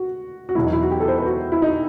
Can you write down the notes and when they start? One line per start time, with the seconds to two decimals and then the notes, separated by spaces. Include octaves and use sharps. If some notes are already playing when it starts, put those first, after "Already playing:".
Already playing: F#4
0.49 F#4
0.55 E2 B2 F#3 E4
0.65 D#4
0.73 E4
0.82 F#4
0.91 G4
1.00 A4
1.08 C5
1.18 B4
1.26 F#4
1.52 E4
1.62 D#4